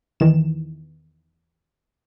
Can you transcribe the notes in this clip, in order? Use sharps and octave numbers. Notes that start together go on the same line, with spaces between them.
E2 D#3 E3 E7